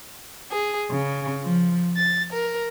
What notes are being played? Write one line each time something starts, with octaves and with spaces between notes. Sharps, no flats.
G#4
C#3
F3
A6
A#4